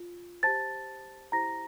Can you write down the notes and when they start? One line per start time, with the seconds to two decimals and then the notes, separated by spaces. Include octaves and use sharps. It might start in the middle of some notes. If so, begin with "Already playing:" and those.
Already playing: F4
0.43 G4 C5 A5 A6
1.32 E4 G4 C5 A#5 A#6